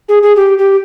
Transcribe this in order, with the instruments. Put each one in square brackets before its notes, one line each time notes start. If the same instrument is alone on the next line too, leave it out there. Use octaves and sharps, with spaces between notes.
[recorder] G#4
G#4
G4
G4